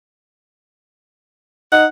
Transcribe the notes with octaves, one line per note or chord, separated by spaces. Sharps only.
D#4 F#5